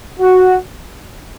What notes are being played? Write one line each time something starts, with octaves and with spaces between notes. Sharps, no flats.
F#4